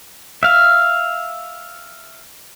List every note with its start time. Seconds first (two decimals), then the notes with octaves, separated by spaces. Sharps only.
0.43 E5 F5